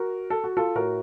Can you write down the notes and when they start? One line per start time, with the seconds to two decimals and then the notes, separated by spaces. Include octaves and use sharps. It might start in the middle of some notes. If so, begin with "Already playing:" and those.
Already playing: F#4 A#4
0.30 A4
0.44 F#4
0.57 F4 A4
0.75 A2 F#4 A#4